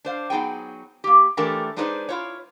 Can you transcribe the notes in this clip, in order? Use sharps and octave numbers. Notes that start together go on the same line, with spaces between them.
D4 C5 F5
F#3 B3 D#4 G#4 G5
A#3 G4
E3 A3 D4 G4 A4 A#4
G#3 D4 D#4 G#4 B4 C5
E4 F4 C#5